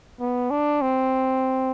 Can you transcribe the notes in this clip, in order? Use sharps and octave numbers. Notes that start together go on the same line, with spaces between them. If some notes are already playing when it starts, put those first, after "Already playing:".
B3
D4
C4